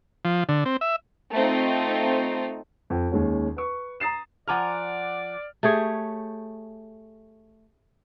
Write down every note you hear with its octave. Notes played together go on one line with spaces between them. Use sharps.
F3
D3
C4
E5
A3 C4 D#4 F4
F2
D#2 G#3 C#4
B4 C#6
A#5 D#6 A6 C7 E7
F3 D5 F#5 G#5 A#5 D6 F6
A3 G4 G#4 C#5